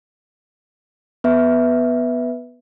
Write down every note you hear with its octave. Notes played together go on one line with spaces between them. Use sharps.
B3 B4 E5